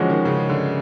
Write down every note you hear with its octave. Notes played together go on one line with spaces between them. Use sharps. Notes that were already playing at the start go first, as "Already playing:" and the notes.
Already playing: D3 E3 F3 G#3 C#4 F#4
D#3
C#3
D3